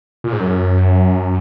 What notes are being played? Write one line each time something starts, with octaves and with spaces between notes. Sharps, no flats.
A#2
G#2
F#2